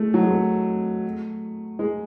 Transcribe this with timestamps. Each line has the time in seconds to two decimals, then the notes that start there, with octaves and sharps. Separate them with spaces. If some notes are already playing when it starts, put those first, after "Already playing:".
Already playing: G#3 A3
0.14 F#3
0.22 G#3
0.30 A3
1.79 G#3